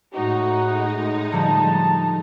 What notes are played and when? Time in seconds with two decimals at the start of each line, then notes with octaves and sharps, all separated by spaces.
0.14 A2 G#3 D#4 F#4
1.32 D3 F3 G3 A5